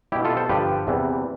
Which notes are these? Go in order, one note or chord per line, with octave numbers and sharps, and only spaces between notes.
B2 G3 E4 G4
F4 A4
A4 C5
G2 D3 F3 G4 B4
E2 C3 E3 G3